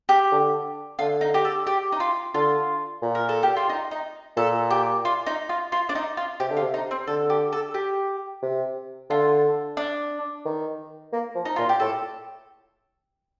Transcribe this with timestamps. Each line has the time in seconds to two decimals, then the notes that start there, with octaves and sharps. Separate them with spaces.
0.09 G4
0.32 D3
0.99 D3 F4
1.21 D#4
1.34 G4
1.45 A4
1.67 G4
1.92 D#4
2.00 F4
2.34 D3 F4
3.02 A#2
3.15 A#4
3.29 A4
3.43 G4
3.56 F4
3.69 D#4
3.91 D#4
4.37 A#2 A4
4.70 G4
5.05 F4
5.26 D#4
5.49 F4
5.72 F4
5.89 D4
5.95 D#4
6.17 F4
6.40 C3 G4
6.51 D3
6.57 F4
6.62 C3
6.74 D#4
6.91 C4
7.07 D3 A4
7.30 G4
7.53 A4
7.74 G4
8.42 C3
9.10 D3 F4
9.77 D4
10.45 D#3
11.13 A#3
11.35 F3
11.45 D#4
11.56 A#2 F4
11.69 G4
11.80 A2 A4